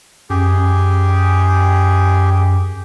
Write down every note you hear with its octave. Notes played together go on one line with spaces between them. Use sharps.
F#2 G4 G#4